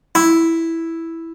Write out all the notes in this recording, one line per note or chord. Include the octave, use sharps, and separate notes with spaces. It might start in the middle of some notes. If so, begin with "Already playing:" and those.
E4